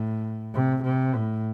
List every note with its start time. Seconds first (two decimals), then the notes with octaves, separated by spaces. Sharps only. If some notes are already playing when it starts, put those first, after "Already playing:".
Already playing: A2
0.55 C3
0.84 C3
1.16 A2